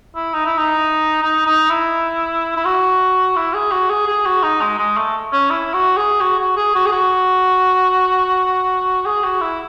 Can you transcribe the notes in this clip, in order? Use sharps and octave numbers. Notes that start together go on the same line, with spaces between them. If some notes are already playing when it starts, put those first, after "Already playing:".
E4
D#4
E4
D#4
D#4
D#4
E4
E4
F#4
E4
G#4
F#4
G#4
G#4
F#4
D#4
G#3
G#3
A3
C#4
E4
F#4
G#4
F#4
F#4
G#4
F#4
G#4
F#4
G#4
F#4
E4